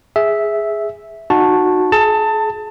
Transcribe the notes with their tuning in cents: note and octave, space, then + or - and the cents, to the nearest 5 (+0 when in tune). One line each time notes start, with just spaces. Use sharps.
G#4 +0 E5 -5
D#4 -15 F#4 -15 A5 +0
G#4 +35 A5 +20